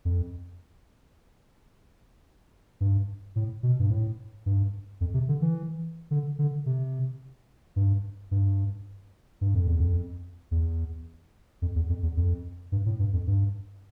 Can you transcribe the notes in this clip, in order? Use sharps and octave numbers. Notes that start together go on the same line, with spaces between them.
F2
G2
A2
B2
G2
A2
G2
F2
C3
D3
E3
D3
D3
C3
G2
G2
G2
F2
E2
F2
E2
F2
E2
F2
E2
F2
G2
A2
G2
F2
G2